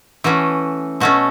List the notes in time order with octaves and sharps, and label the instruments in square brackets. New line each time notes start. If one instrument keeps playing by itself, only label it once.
[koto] E3 A3 C#4 F#4
B2 A3 C#4 F#4